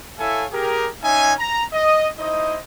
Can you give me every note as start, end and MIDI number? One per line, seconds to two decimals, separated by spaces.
0.19 0.45 64
0.19 0.45 69
0.19 0.45 73
0.19 0.45 76
0.19 0.45 77
0.19 0.45 80
0.52 0.88 67
0.52 0.88 68
0.52 0.88 70
1.03 1.34 61
1.03 1.34 63
1.03 1.34 73
1.03 1.34 76
1.03 1.34 80
1.39 1.65 82
1.73 2.08 75
2.19 2.58 63
2.19 2.58 64
2.19 2.58 72
2.19 2.58 75